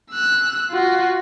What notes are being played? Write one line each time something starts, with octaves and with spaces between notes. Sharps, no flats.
E6 F#6
F4 F#4